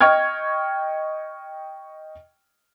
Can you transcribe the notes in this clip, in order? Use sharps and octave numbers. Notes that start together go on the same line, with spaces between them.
D#5 G5 C#6 F6 G#6